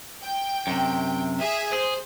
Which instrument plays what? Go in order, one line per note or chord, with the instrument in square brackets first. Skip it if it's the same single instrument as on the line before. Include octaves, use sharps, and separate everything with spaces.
[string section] G5
[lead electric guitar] F#2 C3
[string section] G#4 E5
[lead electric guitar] G#4 [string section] C5